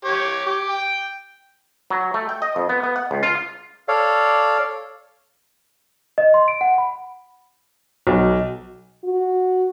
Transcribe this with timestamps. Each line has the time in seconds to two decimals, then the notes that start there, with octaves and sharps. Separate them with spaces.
0.04 G4 C#5
0.46 G4
0.69 G5
1.90 F#3
2.14 A3
2.29 G5
2.42 D#5
2.56 F2
2.69 B3
2.83 B3
2.96 F#5
3.11 C#2
3.23 F4
3.88 A4 C#5 D5 F5
6.18 D#5
6.34 C6
6.48 D7
6.61 F#5
6.78 B5
8.07 B1
9.04 F#4